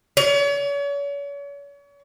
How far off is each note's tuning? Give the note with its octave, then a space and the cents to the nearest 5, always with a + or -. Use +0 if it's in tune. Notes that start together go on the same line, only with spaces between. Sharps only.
C#5 +40